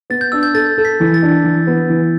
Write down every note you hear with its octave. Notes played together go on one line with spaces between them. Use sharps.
B3 A6
G6
D4 E6
G6
A4 A6
A4
B6
E3
A6
D4
E3
B3
E3